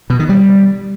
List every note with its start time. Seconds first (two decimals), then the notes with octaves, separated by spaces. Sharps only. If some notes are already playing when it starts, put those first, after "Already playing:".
0.10 B2
0.19 D#3
0.29 G3